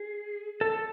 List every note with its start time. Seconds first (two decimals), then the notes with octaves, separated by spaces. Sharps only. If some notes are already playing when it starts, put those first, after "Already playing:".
Already playing: G#4
0.61 A4